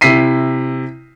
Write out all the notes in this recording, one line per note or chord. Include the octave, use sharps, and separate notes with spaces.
C3 E4 B6 C7 D#7